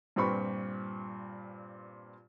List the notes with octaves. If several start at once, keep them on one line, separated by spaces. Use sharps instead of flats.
G2 A#2 C4 B4 B5 C#6